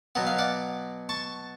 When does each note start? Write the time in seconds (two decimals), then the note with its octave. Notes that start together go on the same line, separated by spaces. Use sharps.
0.15 B2 F#3 B3 F#5
0.27 F5
0.38 D5 F#5
1.09 A5 C#6